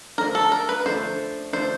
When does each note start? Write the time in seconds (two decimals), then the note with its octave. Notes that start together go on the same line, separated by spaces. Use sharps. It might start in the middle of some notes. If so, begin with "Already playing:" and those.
0.18 D3 F3 A3 D4 A#4
0.35 A4
0.52 A#4
0.69 B4
0.85 D3 F3 A3 D4 C5
1.53 D3 F3 A3 D4 C5